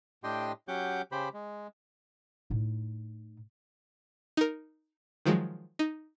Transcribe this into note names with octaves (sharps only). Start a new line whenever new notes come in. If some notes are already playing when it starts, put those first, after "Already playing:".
A2 D4 G4 D#5 G5 C6
F#3 C#4 G4 F#5 D6 G6
C#3 G4 C5 B5
G#3
A2 D#4
D#4 A#4
D#3 F3 F#3 G#3
D#4